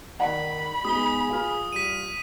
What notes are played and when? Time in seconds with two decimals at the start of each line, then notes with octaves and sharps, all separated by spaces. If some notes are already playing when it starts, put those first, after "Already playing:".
0.20 D#3 D5 F#5 B5
0.85 G#3 B3 D#4 G#4 D#6 G7
1.30 F4 F6
1.72 G3 B6 D#7